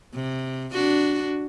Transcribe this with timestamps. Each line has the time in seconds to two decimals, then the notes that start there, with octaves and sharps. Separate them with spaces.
0.15 C3
0.72 D4 F#4